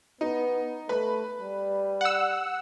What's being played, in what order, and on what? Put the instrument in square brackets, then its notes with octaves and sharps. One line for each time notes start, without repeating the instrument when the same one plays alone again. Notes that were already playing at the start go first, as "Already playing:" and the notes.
[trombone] B3 [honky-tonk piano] D#4
[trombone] A3 [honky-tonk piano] B4 B5
[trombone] G3
[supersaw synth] F#5 E6